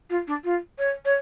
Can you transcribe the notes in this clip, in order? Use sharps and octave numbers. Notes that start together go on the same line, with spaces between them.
F4
D4
F4
C#5
C#5